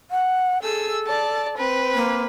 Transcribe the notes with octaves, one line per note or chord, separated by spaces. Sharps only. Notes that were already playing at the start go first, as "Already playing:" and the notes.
F#5
G#4 A4 E6
D5 A5
C4 B4
A#3